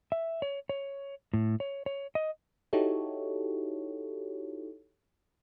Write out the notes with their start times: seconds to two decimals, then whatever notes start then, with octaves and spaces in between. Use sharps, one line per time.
0.12 E5
0.42 C#5
0.69 C#5
1.33 A2
1.60 C#5
1.86 C#5
2.15 D#5
2.73 D#4 E4 F#4 G4 A4 C#5